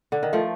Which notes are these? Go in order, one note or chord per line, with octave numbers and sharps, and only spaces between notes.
D3
D#3
F3 A3